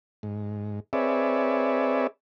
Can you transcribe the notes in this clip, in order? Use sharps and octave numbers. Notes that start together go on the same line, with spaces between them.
G#2
C4 G#4 B4 C#5 D5 E5